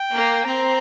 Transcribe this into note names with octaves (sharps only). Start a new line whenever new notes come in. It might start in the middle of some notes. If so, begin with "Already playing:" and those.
Already playing: G5
A#3
C4 A#5